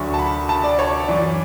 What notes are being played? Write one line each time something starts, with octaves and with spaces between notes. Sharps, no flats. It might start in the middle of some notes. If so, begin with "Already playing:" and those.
Already playing: D2 D3 F#3 C#6
A5
B5
A5
D5
C#5
F#2 E3 D5